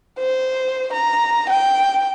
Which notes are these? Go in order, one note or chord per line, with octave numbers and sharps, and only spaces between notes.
C5
A#5
G5